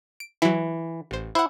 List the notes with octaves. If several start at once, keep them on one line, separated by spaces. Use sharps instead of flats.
D7
E3 F#3 E4
A1 C5
E4 C5 F#5